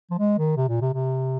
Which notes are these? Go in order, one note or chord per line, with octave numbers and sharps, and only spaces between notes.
F3
G#3
D#3
C3
A#2
C3
C3